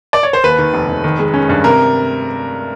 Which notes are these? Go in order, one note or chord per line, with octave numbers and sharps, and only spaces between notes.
D5
C#5
C5
D#2 B4
D#3
F1
F1
D#3
G#3
C#4
G2
C3 A#4